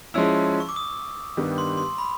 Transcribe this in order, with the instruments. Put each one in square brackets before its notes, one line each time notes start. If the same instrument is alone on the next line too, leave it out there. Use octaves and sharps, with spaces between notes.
[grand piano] F3 G#3 C#4 E4 [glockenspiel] E6
[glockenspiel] C#6
D6
D#6
[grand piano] G2 D#3 G3 B3
[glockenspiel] C6
C6
B5